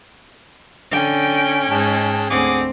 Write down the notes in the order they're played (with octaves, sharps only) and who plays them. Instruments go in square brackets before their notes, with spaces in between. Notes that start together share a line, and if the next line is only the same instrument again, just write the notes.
[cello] D3 G5 [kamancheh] C#4
[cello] G#2 [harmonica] G#3 G5 A5
[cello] D2 C4 [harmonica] G#4 F#5 D6